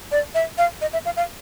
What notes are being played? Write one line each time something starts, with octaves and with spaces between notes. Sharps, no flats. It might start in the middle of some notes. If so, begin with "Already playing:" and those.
D5
E5
F5
D#5
E5
F5
F5